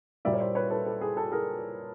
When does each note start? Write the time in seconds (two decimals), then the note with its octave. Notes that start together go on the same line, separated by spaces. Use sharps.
0.25 A#2 G3 A#3 D5 E5
0.33 C#5
0.40 C5 D5
0.55 B4 C#5
0.70 A4 B4
0.86 A4
1.01 G#4
1.17 A4
1.32 G#4 A#4